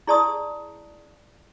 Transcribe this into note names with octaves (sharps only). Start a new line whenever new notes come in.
E4 G#4 D5 A5 C6 D#6